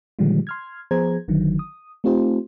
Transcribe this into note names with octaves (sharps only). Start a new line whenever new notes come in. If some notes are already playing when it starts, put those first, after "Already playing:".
A#2 D3 D#3 F3 G3 G#3
C6 F6 G#6
F3 B3 G#4 C5 A#5 G#6
G1 D3 D#3 F#3
D#6
A3 C4 D#4 F4 G4 C5